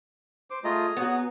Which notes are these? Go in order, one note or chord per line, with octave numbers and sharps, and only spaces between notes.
C5 D6
A3 F4 G#4 D#5 A#5
B3 F#4 C#5